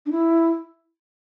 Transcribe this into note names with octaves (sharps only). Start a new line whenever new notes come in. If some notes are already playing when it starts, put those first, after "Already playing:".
D4
E4